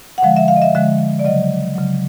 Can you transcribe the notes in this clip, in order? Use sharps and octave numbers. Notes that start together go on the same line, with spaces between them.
F#5
D3 F3 G#3 F5
E5
F5
D#5
E5
D3 F3 G#3 E5
D5
C#3 F#3 D#5
C#3 F#3